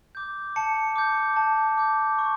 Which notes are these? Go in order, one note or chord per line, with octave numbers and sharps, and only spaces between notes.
D6 G6
A5 C#7
D6 G6
A5
D6 G6
C#6